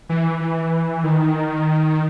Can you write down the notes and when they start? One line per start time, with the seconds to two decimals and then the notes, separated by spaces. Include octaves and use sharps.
0.09 E3
0.41 E3
1.04 D#3